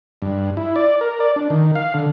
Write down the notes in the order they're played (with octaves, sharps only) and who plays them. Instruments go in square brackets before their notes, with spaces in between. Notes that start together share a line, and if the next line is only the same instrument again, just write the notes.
[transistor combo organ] G2
E4
D5
A#4
D5
D4
D#3
F5
D3